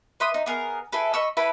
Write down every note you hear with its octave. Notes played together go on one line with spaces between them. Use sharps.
B4 E5 C6 D#6
D#4
B3 G#4 A#4
E4 G#4 A4 B4
D#5 B5 C#6 E6
E4 A4 B4 B5